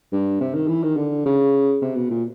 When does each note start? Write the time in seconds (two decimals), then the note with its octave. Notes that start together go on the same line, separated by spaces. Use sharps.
0.12 G2
0.41 C3
0.54 D#3
0.68 E3
0.83 D#3
0.97 D3
1.26 C#3
1.82 C3
1.95 B2
2.11 A#2